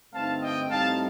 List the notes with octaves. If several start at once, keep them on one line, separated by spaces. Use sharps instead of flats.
G2 D3 A3 C4 D#4 F5 A5
D#5 G5
A2 G3 C4 D#4 F5 A5